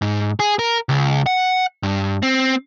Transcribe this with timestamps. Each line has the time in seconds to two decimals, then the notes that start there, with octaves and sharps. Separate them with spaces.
0.02 G#2
0.40 G#4
0.59 A#4
0.89 C#2
1.26 F#5
1.83 G2
2.23 C4